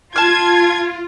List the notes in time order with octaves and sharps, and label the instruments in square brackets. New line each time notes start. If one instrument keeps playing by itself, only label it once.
[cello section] F4 [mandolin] A5 F6 [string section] G#6